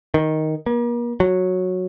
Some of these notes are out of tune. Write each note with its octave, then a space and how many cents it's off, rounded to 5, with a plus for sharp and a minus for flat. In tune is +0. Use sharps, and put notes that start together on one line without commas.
D#3 +5
A#3 +40
F#3 -10